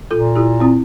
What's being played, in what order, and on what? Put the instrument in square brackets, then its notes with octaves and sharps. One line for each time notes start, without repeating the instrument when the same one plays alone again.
[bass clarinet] A#2 [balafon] F4 A4
[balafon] E4 G4
C4 E4